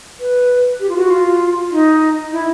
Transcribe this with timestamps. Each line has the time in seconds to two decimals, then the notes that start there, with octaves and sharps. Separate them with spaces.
0.20 B4
0.80 G4
0.89 F4
0.96 F#4
1.10 F4
1.72 D#4
2.32 E4